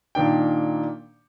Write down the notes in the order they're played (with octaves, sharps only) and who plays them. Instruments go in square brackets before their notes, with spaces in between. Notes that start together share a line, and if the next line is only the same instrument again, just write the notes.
[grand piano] A#2 D#3 D4 G5